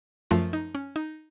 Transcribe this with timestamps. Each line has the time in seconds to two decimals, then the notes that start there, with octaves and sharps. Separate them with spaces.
0.31 F#2 F3 A3 F4
0.53 D#4
0.75 C#4
0.96 D#4